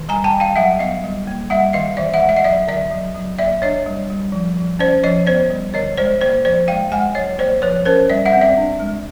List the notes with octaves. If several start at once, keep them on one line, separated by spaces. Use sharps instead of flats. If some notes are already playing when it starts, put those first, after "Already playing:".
Already playing: D#3
G3 G#5 A#5
G5 A5
G3
F5 G5
F#3 E5 F#5
B3 D#5 F5
G3
A#3
G3 E5 F#5
D#3 D#5 F5
E3 D5 E5
E5 F#5
G#3
E5 F#5
D#5
F#3 D5 E5
D3 D5 E5
F#3
F#3
A#3 D5 E5
D4 C#5 D#5
G3
G3
F3
F3
C#4 C5 D5
F3 C#5 D#5
B3 C5 D5
G3
D3 C#5 D#5
G#3 C5 D5
A#3 C5 D5
F3 C5 D5
G#3 F5 G5
G#3 F#5 G#5
F#3 C#5 D#5
A#3 C5 D5
F3 B4 C#5
C#4 A#4 C5
G3 D5 E5
E5 F#5
C4
D5 E5
D4
G#3